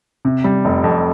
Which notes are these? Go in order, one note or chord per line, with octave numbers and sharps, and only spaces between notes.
C3
G3
F1
F2